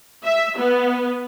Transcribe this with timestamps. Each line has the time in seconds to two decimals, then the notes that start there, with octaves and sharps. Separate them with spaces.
0.25 E5
0.58 B3